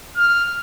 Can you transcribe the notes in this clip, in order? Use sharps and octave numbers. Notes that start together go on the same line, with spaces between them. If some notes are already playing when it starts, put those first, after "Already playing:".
F6